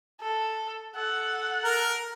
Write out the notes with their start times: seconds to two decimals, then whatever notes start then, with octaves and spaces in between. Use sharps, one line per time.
0.21 A4
0.96 A4 F#5
1.64 A#4